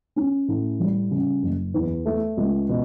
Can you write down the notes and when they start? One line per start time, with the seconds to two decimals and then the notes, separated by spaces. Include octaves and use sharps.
0.16 C#4
0.48 A2
0.80 G3
1.11 C#3
1.43 F#1
1.74 E2
2.06 A3
2.37 C#2
2.69 B2